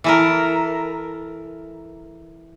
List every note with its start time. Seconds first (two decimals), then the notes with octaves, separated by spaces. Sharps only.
0.04 E3 A4 A#4